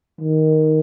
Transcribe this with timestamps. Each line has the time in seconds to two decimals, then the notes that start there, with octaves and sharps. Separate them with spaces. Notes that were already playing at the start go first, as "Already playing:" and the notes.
0.21 D#3